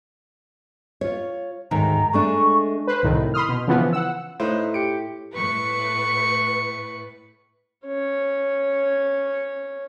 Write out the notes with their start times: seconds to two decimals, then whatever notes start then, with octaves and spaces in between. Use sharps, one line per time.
1.01 F4 C#5
1.71 D2 G#2 D#3 A#5
2.13 G#3 A3 D4 C#6
2.87 B4 C5
3.03 C2 A2 D#3
3.34 B5 C6 D#6 F6
3.49 B2
3.68 C#3 E3 F3 B3
3.93 F#5 E6
4.40 A2 D#4 B4 C5
4.74 G4 C#7 D7
5.36 A2 B4 C#6
7.87 C#4 C#5